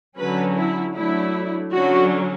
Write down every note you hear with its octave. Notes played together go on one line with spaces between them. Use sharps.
D3 F#3 C#4 B4
E4
F#3 A3 D4 E4
D3 F#3 C#4 F#4